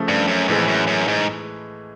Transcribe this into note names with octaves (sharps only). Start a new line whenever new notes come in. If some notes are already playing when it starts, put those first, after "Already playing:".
Already playing: C#3 F3 A3
G2
F#2
F2 A2 E3 G#3
F#2
F#2
G#2